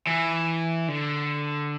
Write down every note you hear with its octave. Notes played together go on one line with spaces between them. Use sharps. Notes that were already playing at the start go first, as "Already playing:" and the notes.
E3
D3